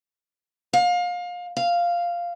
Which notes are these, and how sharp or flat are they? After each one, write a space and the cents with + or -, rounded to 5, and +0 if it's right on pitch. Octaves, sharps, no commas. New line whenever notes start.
F5 +30
F5 -5